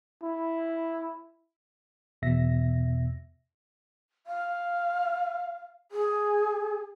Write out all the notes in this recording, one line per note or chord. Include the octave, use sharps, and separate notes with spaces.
E4
E2 B2 E5 A#6
F5
G#4